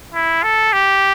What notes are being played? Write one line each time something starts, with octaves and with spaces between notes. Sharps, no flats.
E4
A4
G4